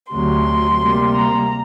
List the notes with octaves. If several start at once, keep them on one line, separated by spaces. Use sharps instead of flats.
D2 C3 F#3 C6
C3 G3 A#3
A#5